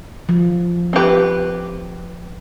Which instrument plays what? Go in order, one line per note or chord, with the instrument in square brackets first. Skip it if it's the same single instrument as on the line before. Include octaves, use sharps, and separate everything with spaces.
[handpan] F3
[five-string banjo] C4 G4 B4